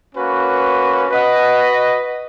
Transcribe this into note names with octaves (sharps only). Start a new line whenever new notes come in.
A#3 C#4 F#4 B4
F#4 B4 D#5 F#5